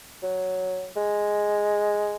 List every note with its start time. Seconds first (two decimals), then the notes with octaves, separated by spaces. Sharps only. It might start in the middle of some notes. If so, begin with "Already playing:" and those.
0.22 F#3
0.96 G#3